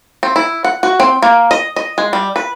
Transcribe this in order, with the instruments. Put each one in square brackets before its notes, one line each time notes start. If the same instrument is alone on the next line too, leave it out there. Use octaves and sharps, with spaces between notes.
[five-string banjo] C4
E4
F#5
F#4
C4
A#3
D#5
D#5
G#3
G3
B4